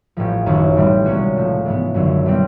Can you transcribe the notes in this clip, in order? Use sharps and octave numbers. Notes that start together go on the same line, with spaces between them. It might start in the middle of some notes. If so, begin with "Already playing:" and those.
A1 A2 F3
F#1 F#2 D#3
A2 E3 G3 C4
C2 B2 G#3 C#4 F#4
A2 F3 A3
G#2 E3 G#3 B3
G#1 F#2 D3 F#3
B2 G3 C4